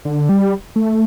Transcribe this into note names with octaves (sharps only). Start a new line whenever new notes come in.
D3
G3
A3